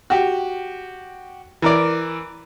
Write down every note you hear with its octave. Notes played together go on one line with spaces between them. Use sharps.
F#4 G4
E3 A#4 D5